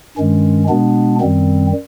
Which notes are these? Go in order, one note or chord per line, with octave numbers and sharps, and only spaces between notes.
G2 D#3 G#3 C#4
B2 G#3 B3 D4
F#2 D#3 G3 C4